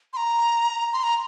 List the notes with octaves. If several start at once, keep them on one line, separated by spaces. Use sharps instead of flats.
C6
A#5
C6
A#5